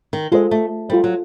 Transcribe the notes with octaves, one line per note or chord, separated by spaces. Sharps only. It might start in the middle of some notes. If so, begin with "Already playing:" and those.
D#3
G#3 F4 A4 C5 D#5
A3
G3 F4 A4 C5 D#5
F#3